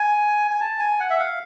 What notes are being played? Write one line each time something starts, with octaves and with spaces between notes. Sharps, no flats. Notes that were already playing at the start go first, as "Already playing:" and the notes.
Already playing: G#5
G#5
A5
G#5
F#5
E5
F5